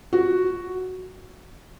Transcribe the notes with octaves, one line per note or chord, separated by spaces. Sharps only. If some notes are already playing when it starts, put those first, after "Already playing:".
F#4